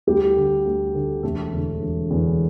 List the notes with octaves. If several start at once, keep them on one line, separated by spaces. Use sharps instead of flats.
D2 G3 G4
D3
D2
D3
E1 A3 A4
E2 D3
E1
E2 D3